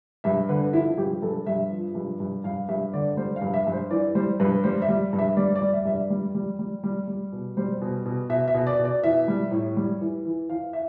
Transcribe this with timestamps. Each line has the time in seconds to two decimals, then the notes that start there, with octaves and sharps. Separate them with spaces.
0.24 G2 E5
0.49 D3 B4
0.73 F3 E4
0.98 G2 G4
1.22 G2 A4
1.47 G2 E5
1.71 F3
1.95 G2
2.20 G2
2.44 G2 F5
2.69 G2 E5
2.93 D3 D5
3.17 G3 C5
3.36 F5
3.42 G2
3.54 E5
3.67 G2
3.73 C5
3.91 E3 D5
4.15 G3 C5
4.40 G2 B4
4.64 G3 C5
4.82 E5
4.88 G3
5.13 G2
5.19 E5
5.37 G3 D5
5.56 D5
5.62 G3
5.73 E5
5.85 G2 E5
5.91 D5
6.10 G3
6.35 G3
6.59 G3
6.83 G3
7.08 G3
7.32 B2
7.57 G3 C5
7.82 B2
8.06 B2
8.30 B2 E5
8.48 E5
8.54 B2
8.67 D5
8.78 B2
8.85 D5
9.04 E3 E5
9.28 G3
9.51 A2
9.76 G3
10.01 E3
10.25 E3
10.49 E3 F5
10.73 E5